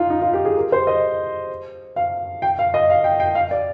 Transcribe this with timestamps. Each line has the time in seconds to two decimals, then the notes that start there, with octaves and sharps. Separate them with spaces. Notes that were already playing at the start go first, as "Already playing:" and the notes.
Already playing: D#4 F4
0.10 D#4
0.22 F4
0.33 G4
0.45 G#4
0.57 A#4
0.72 C5
0.87 D#5
1.96 F5
2.42 G5
2.59 F5
2.74 D#5
2.90 F5
3.04 G5
3.20 G5
3.35 F5
3.51 D5